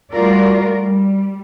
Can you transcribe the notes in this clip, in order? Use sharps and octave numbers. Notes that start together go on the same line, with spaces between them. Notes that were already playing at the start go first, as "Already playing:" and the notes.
G3 A3 F4 F#4 A#4 D5
G3